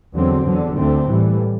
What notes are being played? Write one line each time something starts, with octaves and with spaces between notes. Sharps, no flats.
E2 D3 F#3 C4
E2 D3 F#3
D2 D3 A3 C4
A2 E3 G3